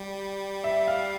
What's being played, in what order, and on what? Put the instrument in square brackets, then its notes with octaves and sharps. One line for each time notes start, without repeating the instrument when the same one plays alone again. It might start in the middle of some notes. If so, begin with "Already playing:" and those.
Already playing: [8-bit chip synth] G3
[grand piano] E5
F5